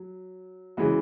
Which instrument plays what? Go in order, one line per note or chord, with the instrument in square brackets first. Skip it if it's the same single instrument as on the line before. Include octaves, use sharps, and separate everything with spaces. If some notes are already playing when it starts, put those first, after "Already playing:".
Already playing: [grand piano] F#3
C#3 E3 G#3 B3 F#4